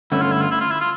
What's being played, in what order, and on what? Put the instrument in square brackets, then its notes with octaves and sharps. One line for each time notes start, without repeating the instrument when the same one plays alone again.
[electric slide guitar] G2 D3 A3 C#4 [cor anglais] E4
[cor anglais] F4
E4
F4
E4
F4
E4
F4